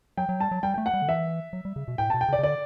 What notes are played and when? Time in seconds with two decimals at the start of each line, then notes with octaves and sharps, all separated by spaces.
0.17 F#3 G5
0.29 F#3
0.40 G3 A5
0.51 F#3
0.63 G3 G5
0.74 A3 G5
0.86 F#5
0.94 G3
1.02 D3
1.08 E3 E5
1.53 F#3
1.65 G3
1.76 C#3
1.88 B2
1.98 A2 G5
2.10 B2 A5
2.21 G5
2.29 C#3
2.33 D5
2.39 C#3
2.43 D3 D5